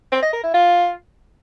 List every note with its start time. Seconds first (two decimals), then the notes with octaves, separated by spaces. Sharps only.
0.12 C4
0.22 D#5
0.33 A#4
0.43 E4
0.54 F4